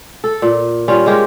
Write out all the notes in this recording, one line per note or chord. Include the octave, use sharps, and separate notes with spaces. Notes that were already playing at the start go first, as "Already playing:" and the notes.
A4
A#2
G3 C#4 F4
G#3 G4 A#4